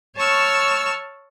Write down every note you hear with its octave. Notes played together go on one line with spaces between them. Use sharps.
C#5 A5 C#6 E6 F6